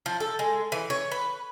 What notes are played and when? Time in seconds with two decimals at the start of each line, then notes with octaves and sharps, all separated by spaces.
0.06 F3
0.20 A4
0.39 G#3
0.72 E3
0.90 C#5
1.11 B4